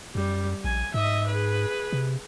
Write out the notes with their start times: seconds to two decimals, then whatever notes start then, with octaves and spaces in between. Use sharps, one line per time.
0.15 F#2 G3
0.64 A#1 G#5
0.94 G#2 D#5 E5
1.28 G#4 B4
1.93 C3